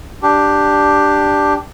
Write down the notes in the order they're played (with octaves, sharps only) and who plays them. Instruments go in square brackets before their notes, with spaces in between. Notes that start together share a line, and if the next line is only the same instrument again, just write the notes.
[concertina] D4 G4